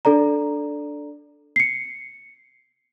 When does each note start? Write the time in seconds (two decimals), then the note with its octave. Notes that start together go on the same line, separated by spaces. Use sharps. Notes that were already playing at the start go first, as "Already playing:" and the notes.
0.05 D4 A4 D5 A#5
1.56 C7 C#7